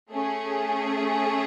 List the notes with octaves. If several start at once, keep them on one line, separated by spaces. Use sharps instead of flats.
A3 C#4 G#4